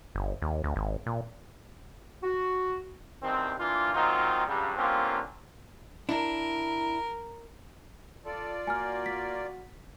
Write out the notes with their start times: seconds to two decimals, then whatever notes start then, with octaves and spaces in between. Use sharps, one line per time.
0.15 G1
0.42 D#2
0.64 D2
0.76 G#1
1.06 A#2
2.23 F#4
3.22 E2 G2 D#3 C4
3.60 E3 A#3 D4 F4
3.95 A#2 D#3 F#3 C4 D#4 F4
4.47 C#2 G2 C#3 F#3 G3
4.77 G2 D3 A#3 C4 C#4 F4
6.09 D4 E4 A#4
8.25 F4 A4 D5
8.67 A#3 F#4 G#5 F6
9.06 B6